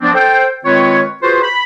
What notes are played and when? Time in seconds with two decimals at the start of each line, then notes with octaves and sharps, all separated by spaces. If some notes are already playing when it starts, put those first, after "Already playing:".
0.01 F3 B3 C4 D4
0.14 A4 C5 G5
0.65 D#3 G#3 C4 F4 B4 C#5
1.22 F4 F#4 G#4 B4 C5
1.43 B5